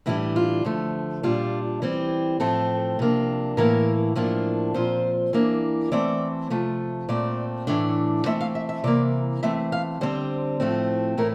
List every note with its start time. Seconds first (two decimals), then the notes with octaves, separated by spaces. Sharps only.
0.06 A2 E3 G3 D4 E4
0.36 F4
0.65 D3 F3 A3
1.23 A#2 G3 D4 F4
1.82 E3 G3 C4
2.40 A2 F3 A3 C4 A4
2.99 C3 F3 A#3 D4
3.57 A2 E3 A#3 A#4
4.16 A2 F3 A#3 D4
4.74 A#2 F3 C4 C5
5.33 E3 A#3 D4
5.92 E3 A3 C4 D5
6.50 C3 F3 A3
7.09 A#2 A3 C4 D5
7.67 A2 E3 A3 D4
8.25 E3 A3 C4 E5
8.41 F5
8.55 E5
8.69 E5
8.84 C3 E3 A#3 D5
9.43 E3 A3 C4 E5
9.72 F5
10.01 D3 G3 C4 C5
10.60 A2 F3 A3 C4
11.17 A2 E3 A3 A#4